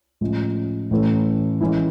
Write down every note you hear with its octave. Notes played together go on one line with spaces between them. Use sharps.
A2 F3 G#3 C#4
A2 E3 A3 C#4
E3 G#3 C#4 E4